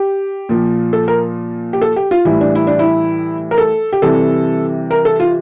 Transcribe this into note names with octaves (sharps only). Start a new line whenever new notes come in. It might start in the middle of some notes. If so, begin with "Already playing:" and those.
Already playing: G4
A#2 F3
A4
A#4
G4
A4
G4
F4
A2 E3 G3 E4
D4
E4
D4
E4
A#4
A4
G4
C3 E3 G3 A4
A#4
A4
F4